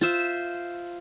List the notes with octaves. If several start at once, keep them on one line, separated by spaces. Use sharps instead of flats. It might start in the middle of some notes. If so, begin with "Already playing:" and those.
F4 C5 E5